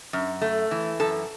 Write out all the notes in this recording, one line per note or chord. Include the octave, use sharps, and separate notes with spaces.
F#2
A3
E3
F#2 A4